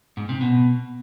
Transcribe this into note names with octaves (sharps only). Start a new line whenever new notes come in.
G#2
C3
B2